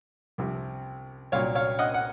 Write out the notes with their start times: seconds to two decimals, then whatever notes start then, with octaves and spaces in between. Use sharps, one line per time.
0.38 C2 C3 F3
1.32 C2 A#2 F#3 C#5 F5
1.55 C#5 F5
1.79 D#5 F#5
1.94 F#5